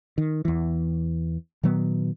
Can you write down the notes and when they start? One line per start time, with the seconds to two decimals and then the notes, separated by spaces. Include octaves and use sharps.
0.18 D#3
0.45 E2 E3
1.63 A#2 D#3 F#3 B3